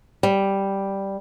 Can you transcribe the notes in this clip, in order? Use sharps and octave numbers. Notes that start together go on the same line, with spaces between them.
G3